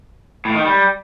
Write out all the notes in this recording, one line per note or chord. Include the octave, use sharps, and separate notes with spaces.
A2
D#3
G3